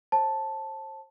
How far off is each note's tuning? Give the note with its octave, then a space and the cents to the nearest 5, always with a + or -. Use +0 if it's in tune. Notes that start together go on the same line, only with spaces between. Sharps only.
C5 +40 A5 +0